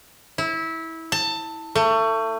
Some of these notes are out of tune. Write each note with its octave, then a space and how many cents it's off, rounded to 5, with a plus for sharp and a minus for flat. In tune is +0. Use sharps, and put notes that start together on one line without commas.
E4 -20
A5 +20
A3 +30